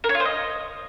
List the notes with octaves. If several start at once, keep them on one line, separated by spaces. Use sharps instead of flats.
A#4
C#5
F4
C5
D#5